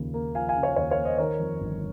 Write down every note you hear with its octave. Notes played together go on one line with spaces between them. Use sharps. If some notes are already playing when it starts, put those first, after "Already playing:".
Already playing: D#2 C#3 F3
A#3
F3 F5 G#5
F5 G#5
C#3
C#5 F5
D#2 C#5 F5
C#5 F5
A#3
C5 D#5
D#3 A#4 C#5
F2
G1